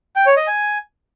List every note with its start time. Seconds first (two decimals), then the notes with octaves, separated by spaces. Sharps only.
0.16 G5
0.26 C#5
0.37 D#5
0.47 G#5